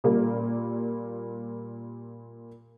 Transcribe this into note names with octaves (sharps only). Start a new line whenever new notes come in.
A#2 G3 A#3